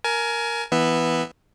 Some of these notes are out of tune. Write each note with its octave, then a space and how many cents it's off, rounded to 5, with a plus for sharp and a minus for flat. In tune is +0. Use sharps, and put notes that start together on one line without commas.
A#4 +0 G#5 +25
E3 +0 B3 +0 E5 +0